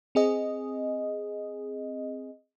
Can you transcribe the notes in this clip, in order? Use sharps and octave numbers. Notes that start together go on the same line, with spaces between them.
C4 G#4 D#5